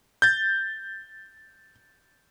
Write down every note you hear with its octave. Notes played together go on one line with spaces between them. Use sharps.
G6 A6